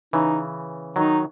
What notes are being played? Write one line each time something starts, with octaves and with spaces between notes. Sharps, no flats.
C#3 E3 D#4
D#3 F#3 D#4